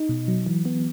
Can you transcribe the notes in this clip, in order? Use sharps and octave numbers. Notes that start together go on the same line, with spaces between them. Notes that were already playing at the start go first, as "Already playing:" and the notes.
Already playing: D#4
B2
F#3
E3
B3